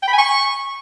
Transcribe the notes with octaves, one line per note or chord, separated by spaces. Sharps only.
G5
B5
G#5
C#6